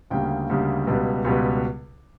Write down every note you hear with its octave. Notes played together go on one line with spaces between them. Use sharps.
D2 C#3 G3 A#3 G5
D2 C#3 G3 A#3
C#2 B2 G3 B3
C#2 B2 G3 B3